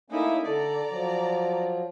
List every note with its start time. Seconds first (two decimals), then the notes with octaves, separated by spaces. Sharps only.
0.10 A3 A#3 C#4 D#4 E4
0.46 D3 A4 D5 A#5
0.91 F3 F#3